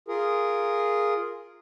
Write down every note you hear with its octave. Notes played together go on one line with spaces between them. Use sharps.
F4 G#4 A#4